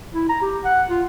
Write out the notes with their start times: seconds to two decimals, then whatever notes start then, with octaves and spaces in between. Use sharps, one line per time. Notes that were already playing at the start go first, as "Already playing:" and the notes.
0.14 E4
0.29 A#5
0.42 G4
0.65 F#5
0.89 F4